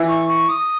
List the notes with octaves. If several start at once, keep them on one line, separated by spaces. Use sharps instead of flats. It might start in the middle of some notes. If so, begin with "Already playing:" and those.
Already playing: E3
C#6
C#6
D#6